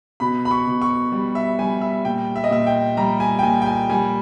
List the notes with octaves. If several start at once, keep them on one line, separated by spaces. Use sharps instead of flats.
B2 B5
B5
C#6
B2
C#6
G3
E5
G3 G#5
E5
A#2 G5
E5
D#5
A#2 E5
G5
G3 A#5
G#5
G5
A#2 G#5
G5
G#5
G3 G#5